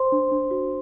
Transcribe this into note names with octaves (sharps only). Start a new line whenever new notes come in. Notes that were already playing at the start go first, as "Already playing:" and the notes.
Already playing: C5 C6
D4
D4
F#4